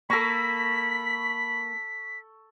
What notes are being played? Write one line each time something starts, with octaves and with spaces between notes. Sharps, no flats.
A#3 A4 B5 C#6 B6